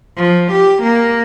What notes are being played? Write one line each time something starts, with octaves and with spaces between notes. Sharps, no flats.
F3
G4
A#3